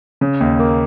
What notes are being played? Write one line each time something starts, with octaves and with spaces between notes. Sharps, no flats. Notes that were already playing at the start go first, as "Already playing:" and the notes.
C#3
D#2
A#3